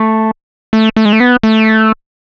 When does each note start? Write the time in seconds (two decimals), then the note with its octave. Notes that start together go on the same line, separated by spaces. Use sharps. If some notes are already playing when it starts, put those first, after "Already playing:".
Already playing: A3
0.73 A3
0.96 A3
1.05 G#3
1.13 A3
1.20 B3
1.43 A3